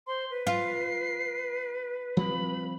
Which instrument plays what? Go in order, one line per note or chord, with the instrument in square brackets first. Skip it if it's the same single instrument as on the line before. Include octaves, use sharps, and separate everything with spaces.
[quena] C5 [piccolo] C6
[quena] B4
[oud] F4 [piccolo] C7
[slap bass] F3 G3 C4 [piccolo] B5